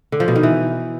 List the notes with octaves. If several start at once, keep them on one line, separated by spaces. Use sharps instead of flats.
D3
F3
B2
D#3
E3